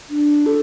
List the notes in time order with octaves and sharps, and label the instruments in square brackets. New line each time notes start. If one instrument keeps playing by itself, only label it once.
[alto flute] D4
A4